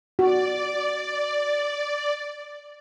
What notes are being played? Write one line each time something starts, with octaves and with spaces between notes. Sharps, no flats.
F#4 D5